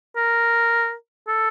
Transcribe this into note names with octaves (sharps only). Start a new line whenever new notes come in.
A#4
A4